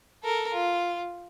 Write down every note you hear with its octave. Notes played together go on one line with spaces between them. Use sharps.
A4 A#4
F4